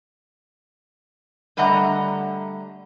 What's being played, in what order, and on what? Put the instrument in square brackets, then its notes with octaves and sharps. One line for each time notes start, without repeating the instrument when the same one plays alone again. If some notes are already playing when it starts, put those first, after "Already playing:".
[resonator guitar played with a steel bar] D3 G3 A3 D#5 F#5 A#5